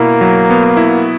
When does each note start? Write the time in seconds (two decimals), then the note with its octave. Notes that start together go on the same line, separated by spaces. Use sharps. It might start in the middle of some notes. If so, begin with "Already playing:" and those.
Already playing: B2 A#3 E4
0.21 F#3
0.50 B3
0.77 E4